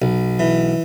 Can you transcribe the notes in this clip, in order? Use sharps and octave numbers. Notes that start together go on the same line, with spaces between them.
B1
E3